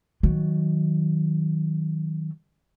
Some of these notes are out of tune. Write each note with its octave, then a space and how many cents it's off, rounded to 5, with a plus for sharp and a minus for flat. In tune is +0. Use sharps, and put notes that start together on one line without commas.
D#3 +20 F#3 +0